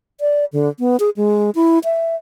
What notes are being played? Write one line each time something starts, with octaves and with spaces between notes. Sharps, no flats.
D5
D3
B3
G#4
G#3
E4
E5